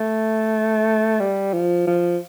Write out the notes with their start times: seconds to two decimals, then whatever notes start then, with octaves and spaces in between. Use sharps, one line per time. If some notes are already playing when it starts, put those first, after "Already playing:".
Already playing: A3
1.20 G3
1.53 F3
1.87 F3